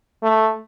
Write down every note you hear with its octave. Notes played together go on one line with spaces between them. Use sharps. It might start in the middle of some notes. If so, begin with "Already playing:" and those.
A3